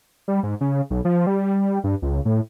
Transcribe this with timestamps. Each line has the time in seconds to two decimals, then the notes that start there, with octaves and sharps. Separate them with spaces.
0.28 G3
0.43 G#2
0.61 C#3
0.90 B1
1.05 F3
1.27 G3
1.84 G2
2.02 C#2
2.25 A2